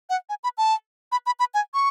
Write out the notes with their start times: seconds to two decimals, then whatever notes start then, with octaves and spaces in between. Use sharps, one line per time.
0.10 F#5
0.29 G#5
0.44 B5
0.58 A5
1.12 B5
1.26 B5
1.39 B5
1.54 G#5
1.74 C#6